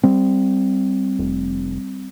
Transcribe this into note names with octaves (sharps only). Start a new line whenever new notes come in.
G3 C4
F1